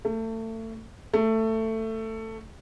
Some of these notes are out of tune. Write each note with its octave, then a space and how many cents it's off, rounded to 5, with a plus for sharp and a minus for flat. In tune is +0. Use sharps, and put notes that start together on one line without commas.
A3 +30
A3 +15